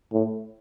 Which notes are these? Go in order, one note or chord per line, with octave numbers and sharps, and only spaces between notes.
A2